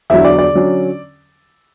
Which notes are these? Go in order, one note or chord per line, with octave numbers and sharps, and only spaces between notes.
E2 D3 F#3 E4 E5
D5
D5
D3 F#3 C#4